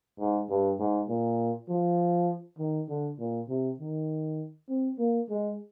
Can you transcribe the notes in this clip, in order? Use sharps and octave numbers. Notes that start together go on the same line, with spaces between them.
G#2
G2
G#2
A#2
F3
D#3
D3
A#2
C3
D#3
C4
A#3
G#3